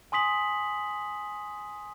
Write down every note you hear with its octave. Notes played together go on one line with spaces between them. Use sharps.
G#5 C6 D#6 B6 F#7